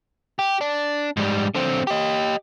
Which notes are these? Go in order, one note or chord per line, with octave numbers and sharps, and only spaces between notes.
G4
D4
G#2 G3
D3 C4
G4 D#5